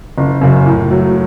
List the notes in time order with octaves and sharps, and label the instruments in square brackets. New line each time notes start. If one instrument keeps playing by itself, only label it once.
[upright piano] F#1
F#2 C#3
A2
F#3 A3